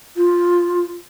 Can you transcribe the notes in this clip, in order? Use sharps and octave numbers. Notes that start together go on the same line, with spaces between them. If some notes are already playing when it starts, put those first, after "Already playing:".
F4